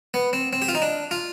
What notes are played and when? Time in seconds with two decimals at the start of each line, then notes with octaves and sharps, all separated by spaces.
0.14 B3
0.33 C4
0.53 C4
0.62 G4
0.68 F4
0.75 D#4
0.82 D4
1.11 F4